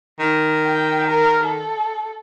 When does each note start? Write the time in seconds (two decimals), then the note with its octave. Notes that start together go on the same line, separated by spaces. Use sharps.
0.20 D#3
0.66 G5
1.08 A#4
1.43 A4